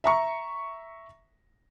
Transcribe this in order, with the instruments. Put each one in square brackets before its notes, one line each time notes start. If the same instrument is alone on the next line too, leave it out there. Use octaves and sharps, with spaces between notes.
[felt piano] E5 A#5 C#6